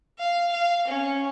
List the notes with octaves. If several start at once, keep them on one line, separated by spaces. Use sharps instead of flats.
F5
F5
C#4